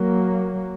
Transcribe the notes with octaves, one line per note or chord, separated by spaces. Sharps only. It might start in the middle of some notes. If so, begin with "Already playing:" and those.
Already playing: F#3 A#3